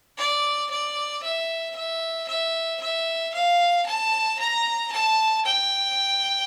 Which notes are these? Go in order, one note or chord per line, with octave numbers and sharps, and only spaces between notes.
D5
D5
E5
E5
E5
E5
F5
A5
A#5
A5
G5